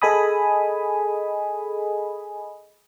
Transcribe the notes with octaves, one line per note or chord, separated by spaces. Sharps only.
G#4 A4 D#5 G#5 B5 D#6